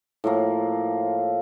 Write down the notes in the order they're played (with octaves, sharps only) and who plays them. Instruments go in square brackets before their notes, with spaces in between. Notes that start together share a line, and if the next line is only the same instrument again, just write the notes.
[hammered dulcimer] A2 F3 A#3